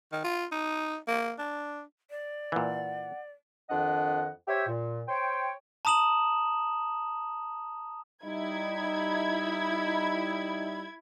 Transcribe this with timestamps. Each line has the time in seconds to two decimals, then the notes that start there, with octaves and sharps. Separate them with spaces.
0.12 D#3
0.24 F4
0.52 D#4
1.08 A#3
1.39 D4
2.10 D5
2.52 A#2 E3 F#5
3.70 F2 D#3 D4 D#5 F#5
4.48 G4 C5 C#5 E5
4.68 A#2
5.08 C5 C#5 G5
5.85 A5 A#5 D#6 E7 F#7
8.24 G3 D#4 E4 G#6